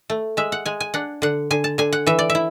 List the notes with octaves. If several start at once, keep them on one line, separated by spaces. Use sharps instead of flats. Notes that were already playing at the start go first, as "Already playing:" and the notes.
A3
G#3 E5
F#5
G#3 G#5
G#5
D4 F#5
D3 F#5
D3 G#5
A5
D3 G#5
F#5
E3 E5
D5
E5
E4